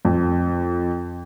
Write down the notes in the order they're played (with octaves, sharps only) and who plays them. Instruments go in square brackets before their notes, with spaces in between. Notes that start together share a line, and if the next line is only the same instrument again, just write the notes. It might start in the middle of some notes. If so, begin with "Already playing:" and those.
[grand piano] F2